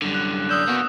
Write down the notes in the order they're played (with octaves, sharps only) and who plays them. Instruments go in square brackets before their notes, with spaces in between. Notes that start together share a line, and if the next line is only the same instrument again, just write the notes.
[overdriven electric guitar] F#2 D3 [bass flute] G3
[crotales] F#6
[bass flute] D5 [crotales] D#6 E6 E7 [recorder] G6
[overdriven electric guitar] A#3 F#4 [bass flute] B3